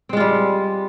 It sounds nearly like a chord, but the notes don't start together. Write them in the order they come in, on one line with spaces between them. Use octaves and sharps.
C4 G#3 F4 G3